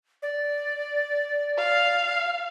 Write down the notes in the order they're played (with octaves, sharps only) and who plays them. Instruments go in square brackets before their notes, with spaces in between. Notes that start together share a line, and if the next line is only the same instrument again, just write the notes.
[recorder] D5
[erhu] F5